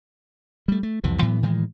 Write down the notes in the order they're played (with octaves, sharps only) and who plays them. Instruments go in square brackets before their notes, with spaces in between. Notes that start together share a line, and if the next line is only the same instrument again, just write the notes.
[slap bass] G3 A3
A3
C2 F2 C3 E3
A2 E3 F#3 B3
A2 D#3 E3 G#3